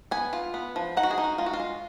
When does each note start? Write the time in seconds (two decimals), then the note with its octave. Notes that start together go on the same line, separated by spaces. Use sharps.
0.11 B3 G#5
0.33 F4
0.54 B3
0.76 F3
0.97 D#4 F#5
1.03 F#4
1.11 G#4
1.18 D#4
1.24 F#4
1.38 G#3 F4
1.46 F#4
1.53 F4
1.60 G#3